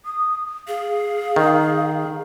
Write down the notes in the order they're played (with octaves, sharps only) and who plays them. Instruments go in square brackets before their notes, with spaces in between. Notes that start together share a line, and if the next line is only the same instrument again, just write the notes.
[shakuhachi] D#6
[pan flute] G#4 [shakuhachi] F5
[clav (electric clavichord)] D#3